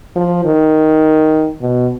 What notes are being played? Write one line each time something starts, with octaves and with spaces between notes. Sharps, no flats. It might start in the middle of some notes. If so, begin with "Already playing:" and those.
F3
D#3
B2